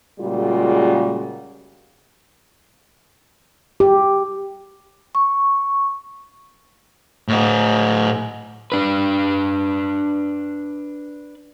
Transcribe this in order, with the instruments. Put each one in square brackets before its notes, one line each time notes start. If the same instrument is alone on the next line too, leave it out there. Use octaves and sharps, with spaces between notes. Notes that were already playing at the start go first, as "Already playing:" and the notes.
[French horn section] A#2 C#3 G3 G#3 F4 F#4
[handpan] G4
[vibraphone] C#6
[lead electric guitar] A2 D#5
[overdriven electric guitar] D4 B4